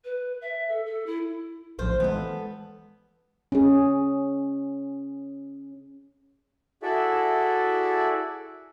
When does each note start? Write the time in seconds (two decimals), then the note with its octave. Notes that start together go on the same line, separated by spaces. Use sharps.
0.04 B4
0.41 E5
0.68 A4
0.85 A4
1.06 E4
1.79 A#1 A2 F3 F4 C5
2.00 E3 G#3 B3 A4
3.52 C#4 G#4
6.83 E4 F#4 G#4 A4 D5 E5